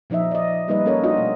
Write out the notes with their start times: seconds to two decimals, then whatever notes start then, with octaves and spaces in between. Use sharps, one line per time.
0.10 A#2 F3 D#4 D#5 E5
0.31 D5 D#5
0.68 G3 A#3 D#4 B4 D#5
0.86 A#3 C#4 A4 A#4 C#5
1.03 D4 D#4 F4 F#4 D#5
1.17 B2 A3